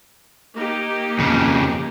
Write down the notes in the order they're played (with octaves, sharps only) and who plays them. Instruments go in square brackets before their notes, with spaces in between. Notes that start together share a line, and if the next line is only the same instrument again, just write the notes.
[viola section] A#3 D#4 G4
[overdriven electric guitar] F2 C#3